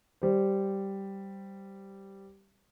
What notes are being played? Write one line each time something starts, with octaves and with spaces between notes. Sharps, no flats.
G3 C5